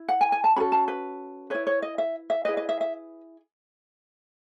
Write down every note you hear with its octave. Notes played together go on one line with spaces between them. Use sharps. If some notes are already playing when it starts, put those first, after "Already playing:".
Already playing: E4
F#5
G#5
G#5
A5
C#4 F#4 A4 B5
A5
B4
E4 B4 C#5
C#5
D#5
E5
E5
E4 G#4 B4 D#5
D#5
E5
E5